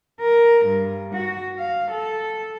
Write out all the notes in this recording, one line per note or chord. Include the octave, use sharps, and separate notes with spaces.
A#4
G2
F#4
F5
A4